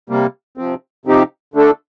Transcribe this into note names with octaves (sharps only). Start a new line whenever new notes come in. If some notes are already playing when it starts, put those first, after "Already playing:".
C3 G3 A#3
C3 F3 C4
C3 F3 C4 D#4 G4
D3 A3 D4 A4